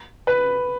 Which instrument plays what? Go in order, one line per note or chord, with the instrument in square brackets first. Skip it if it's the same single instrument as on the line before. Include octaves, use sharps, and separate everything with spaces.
[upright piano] B4